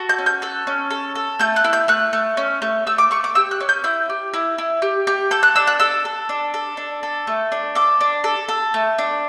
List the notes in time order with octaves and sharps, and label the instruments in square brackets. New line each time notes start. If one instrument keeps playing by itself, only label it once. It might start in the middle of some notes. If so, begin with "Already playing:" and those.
Already playing: [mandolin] F#4 A4
G6
C#4
G6
A4 F#6
C#4
A4
A4
A3 G6
F#6
E4
G6
A3 F#6
A3
C#4
A3
A3 E6
D6
A3 C#6
D6
G4 E6
F#6
C#4
G6
E4 G6
G4
E4
E4
G4
G4
A4 G6
F#6
D4 E6
F#6
A4 E6
A4
D4
A4
D4
A4
A3
D4
A4 D6
D4
A4
A4
A3
D4